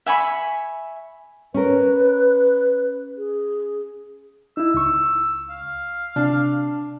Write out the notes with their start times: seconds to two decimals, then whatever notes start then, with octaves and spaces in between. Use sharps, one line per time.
0.06 E5 G#5 B5 C#6
1.54 C#4 A#4 B4
3.17 G#4
4.57 D#4 E4 E6
4.74 C#2 C#6
5.50 F5
6.16 C3 D4